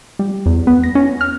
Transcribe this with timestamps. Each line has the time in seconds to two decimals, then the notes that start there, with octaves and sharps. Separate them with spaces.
0.19 G3
0.46 E2
0.67 B3
0.84 A#6
0.95 C#4
1.21 F6